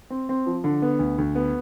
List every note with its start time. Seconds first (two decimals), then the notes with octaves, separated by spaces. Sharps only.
0.10 C4
0.29 C4
0.46 F3
0.64 D3
0.82 B3
0.99 D2
1.18 D2
1.35 B3